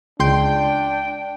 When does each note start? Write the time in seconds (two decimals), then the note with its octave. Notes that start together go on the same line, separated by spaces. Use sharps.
0.20 C#2 D4 G5 C6 G6